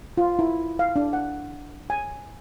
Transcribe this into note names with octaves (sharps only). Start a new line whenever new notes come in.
F4
E4
F5
D4
F#5
G#5